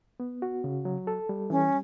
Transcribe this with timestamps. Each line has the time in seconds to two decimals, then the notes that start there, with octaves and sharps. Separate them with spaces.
0.20 B3
0.42 F#4
0.64 C#3
0.85 F#3
1.07 A4
1.29 G3
1.50 E3 C#4